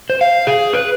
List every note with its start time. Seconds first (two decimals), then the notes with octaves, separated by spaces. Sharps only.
0.10 C5
0.21 F5
0.47 G#4
0.73 B4